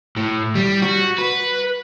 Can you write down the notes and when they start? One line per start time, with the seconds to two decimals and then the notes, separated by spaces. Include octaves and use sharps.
0.16 A2
0.55 G3
0.82 F#4
1.18 B4